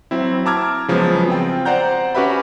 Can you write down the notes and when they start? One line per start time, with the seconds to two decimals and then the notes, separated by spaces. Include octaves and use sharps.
0.11 F#3 C4 E4
0.46 A5 A#5 D6 E6 F6 G#6
0.88 C#3 F3 F#3 G#3 B3
1.28 C4 F4 G5
1.65 C5 D5 F#5 A#5 G6
2.15 C#4 F#4 G4 B4 E5 B5